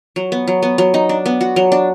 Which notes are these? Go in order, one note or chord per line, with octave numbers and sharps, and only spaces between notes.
F#3
B3
F#3
B3
F#3
D#4
D4
B3
F#4
F#3
D4